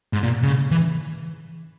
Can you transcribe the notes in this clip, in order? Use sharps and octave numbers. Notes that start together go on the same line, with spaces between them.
G#2
A#2
C#3
E3